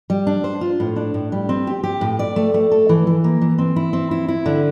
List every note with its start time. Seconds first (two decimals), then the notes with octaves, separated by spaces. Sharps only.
0.10 G3
0.27 D4
0.44 C5
0.61 F4
0.80 A2
0.96 D4
1.14 A2
1.32 G3
1.49 C4
1.67 G4
1.83 G4
2.01 A2
2.19 D5
2.36 A3
2.54 A3
2.72 A4
2.89 E3
3.07 E3
3.24 A#3
3.42 E3
3.58 C4
3.76 E4
3.93 C4
4.11 E4
4.28 E4
4.46 D3